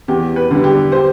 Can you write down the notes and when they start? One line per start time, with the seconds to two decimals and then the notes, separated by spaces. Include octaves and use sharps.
0.08 E2 G4
0.36 B4
0.51 D3 G3
0.64 G4
0.92 C5